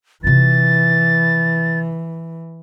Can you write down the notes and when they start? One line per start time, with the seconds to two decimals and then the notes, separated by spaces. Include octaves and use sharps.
0.24 C3 E3 F4 A6